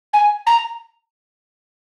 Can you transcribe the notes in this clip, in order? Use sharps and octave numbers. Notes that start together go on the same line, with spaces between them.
G#5
A#5